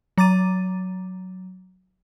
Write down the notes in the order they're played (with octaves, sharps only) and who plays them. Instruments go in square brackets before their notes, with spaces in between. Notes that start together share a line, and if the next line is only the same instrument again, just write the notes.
[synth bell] F#3 A#5 D6 A6 D#7